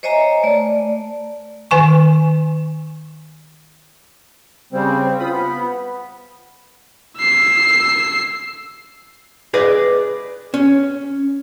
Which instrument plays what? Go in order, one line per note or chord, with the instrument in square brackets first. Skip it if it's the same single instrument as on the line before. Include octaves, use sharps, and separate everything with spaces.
[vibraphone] C5 C#5 D#5 E5 G#5 A#5
A3 D5
[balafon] D#3 G#5 C#6
[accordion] C#3 G3 C4 [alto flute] C5
[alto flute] C5
[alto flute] F4 [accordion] B5 D#6
[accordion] B3 [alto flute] B5
[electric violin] E6 C7
[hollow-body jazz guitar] G#4 B4 D5 D#5
C#4